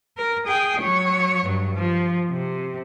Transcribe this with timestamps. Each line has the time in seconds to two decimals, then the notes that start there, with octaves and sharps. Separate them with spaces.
0.18 A#4
0.46 G#4 G5
0.81 F#3 C#5
1.44 G2 F#3
1.74 F3
2.30 C3